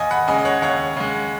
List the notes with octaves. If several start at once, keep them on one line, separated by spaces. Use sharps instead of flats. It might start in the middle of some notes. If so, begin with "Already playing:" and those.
Already playing: D#2 D#5 G#5
F#5 B5
C#3 G#3 D#5 G#5
D#5
C#5 F#5
D#2 C#5 F#5
C#3 G#3